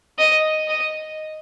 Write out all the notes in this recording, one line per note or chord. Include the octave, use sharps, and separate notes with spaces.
D#5
D#5